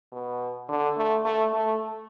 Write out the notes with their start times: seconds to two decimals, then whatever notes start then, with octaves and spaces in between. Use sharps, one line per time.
0.12 B2
0.69 D3
0.97 A3
1.25 A3
1.54 A3